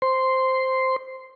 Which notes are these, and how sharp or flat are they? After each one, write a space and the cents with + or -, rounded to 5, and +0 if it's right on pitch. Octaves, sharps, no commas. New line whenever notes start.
C5 +0 C6 -5